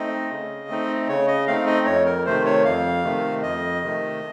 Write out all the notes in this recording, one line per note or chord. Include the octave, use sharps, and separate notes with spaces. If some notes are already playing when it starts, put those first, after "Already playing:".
Already playing: A3 C4 D#4 D#5
C#3
A3 C4 D#4
C#3 C#5
D#5
A3 C4 D#4 F5
D#5
F2 C#5
A#4
C3 D#3 A3 C5
C#5
F2 F5
C3 D#3 A3
F2 D#5
C3 D#3 A3